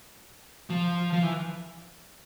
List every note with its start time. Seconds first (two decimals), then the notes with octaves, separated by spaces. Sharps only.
0.70 F3
1.13 F3
1.23 E3